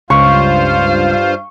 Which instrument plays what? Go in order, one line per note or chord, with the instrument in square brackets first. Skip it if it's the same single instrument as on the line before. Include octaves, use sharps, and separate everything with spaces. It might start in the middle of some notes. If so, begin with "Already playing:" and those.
[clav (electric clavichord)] C#2 [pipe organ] G2 F4 C5 [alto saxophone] F5 [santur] C#6